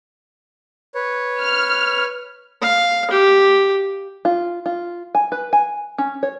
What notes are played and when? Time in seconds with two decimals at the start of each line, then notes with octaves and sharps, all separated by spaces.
0.95 B4 C#5
1.41 F6
2.62 F5
3.11 G4
4.25 F4
4.66 F4
5.15 G#5
5.32 B4
5.53 G#5
5.98 C#4
6.23 C#5